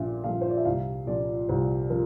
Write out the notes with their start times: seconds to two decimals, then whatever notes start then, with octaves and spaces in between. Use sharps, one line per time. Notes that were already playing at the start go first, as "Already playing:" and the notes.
Already playing: A#1 A#2 F3 E5
0.24 A#2 F3 F5
0.41 C5
0.49 D5
0.57 E5
0.65 C2 F5
1.07 A#2 F3 D5
1.49 C2 C5
1.90 F3 A#4